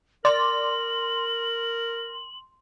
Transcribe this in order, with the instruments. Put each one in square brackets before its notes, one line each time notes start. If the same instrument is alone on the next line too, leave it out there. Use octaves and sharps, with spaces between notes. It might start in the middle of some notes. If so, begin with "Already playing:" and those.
[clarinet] A#4 [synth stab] D5 [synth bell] C6 [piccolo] F#7